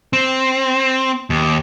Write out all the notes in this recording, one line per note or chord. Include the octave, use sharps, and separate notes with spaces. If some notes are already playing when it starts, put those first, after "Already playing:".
C4
D#2